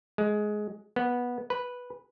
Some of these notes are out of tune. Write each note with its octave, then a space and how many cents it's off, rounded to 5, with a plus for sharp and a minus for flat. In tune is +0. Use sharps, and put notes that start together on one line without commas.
G#3 +15
B3 -15
B4 -5